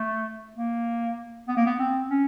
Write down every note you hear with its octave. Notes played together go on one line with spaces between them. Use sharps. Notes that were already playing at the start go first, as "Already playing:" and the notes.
Already playing: A3
A#3
B3
A#3
B3
C4
C#4